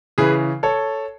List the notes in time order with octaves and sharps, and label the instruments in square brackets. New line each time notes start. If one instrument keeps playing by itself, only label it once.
[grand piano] C#3 E3 G#4 B4
A4 C#5